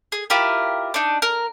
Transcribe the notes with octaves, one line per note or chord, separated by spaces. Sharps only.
G#4
E4 F4 G4 A#4
D4 D#4
A#4